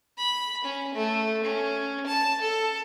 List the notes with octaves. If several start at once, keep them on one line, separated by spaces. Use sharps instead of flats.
B5
C#4
A3
C#4
A5
A4